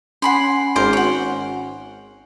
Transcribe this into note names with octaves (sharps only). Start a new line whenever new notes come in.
C#4 F#5 G#5 B5 C6 C7
G#1 A#4 C5 D6
C#5 F#5